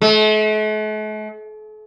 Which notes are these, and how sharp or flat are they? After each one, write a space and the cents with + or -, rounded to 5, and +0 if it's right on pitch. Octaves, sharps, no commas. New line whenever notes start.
A3 -45